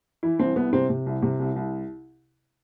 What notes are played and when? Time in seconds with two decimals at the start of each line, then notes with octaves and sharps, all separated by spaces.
0.23 E3 E4
0.39 C2 C4
0.56 C2 B3
0.73 C3 C4
0.90 C3
1.06 C2
1.22 C3
1.39 C2
1.56 C2